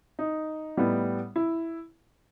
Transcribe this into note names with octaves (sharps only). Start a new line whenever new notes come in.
D#4
A2 G3 B3
E4